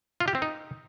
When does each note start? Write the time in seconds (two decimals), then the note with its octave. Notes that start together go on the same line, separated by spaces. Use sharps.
0.20 F4
0.28 G4
0.35 C4
0.42 D#4